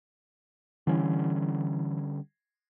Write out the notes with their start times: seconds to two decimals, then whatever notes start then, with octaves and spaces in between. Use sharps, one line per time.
0.87 D3 E3 G3 C#4